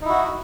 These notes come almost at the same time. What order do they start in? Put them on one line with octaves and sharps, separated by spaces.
D#4 E4 F#4